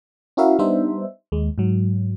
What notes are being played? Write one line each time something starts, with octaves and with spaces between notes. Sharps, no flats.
C#4 E4 F#4 A#4 E5 F5
G3 B3 D4 D#4 C5 E5
D#2 G#3
G#2 F#3